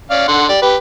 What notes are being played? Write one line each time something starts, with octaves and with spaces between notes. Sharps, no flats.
C#4 D5 F5
D3 F#5 C6
G4 D5
G4 B4